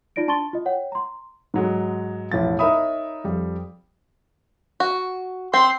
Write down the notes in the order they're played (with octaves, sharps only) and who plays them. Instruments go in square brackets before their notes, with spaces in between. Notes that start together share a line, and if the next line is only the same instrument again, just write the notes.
[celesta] D#4 F4 D5 A#6 D7
D4 A5 C6 C#6 A6 G7
F4 D#5
C#5 F#5 G5
A#5 C6
[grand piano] G#2 F#3 G#3
E1 A1 F3 E4 A6
D#4 A#4 C#5 E5 B5 D#6
F2 G3
[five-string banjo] F#4
[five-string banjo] C4 [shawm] C6